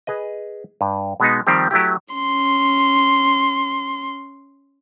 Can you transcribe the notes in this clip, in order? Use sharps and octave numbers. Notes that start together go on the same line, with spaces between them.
G#4 B4 D#5
G2
B2 G#3 B3 D#4
D#3 F3 G3 C4 G4
F#3 A3 E4 G4
C#4 C6